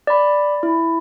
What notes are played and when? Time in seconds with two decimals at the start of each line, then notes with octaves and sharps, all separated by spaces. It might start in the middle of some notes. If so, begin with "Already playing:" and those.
0.07 D5 B5
0.63 E4